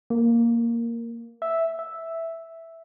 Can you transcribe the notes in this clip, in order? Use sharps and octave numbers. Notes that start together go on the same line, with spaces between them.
A#3
E5
E5